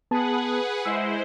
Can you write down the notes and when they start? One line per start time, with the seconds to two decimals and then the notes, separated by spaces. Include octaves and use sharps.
0.11 B3 G#4 B4 F#5 A5
0.85 G#3 E4 C5 E6